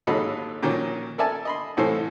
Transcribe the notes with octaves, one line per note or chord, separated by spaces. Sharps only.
D#2 G#2 F#3 A4 D#5 B5
A#2 D#3 F3 F#3 C#4 D4
A4 A#4 D5 E5 G#5 A5
D#5 B5 C6
C2 A2 E3 A4 C5